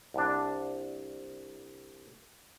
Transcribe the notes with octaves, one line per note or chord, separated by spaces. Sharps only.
C2 D4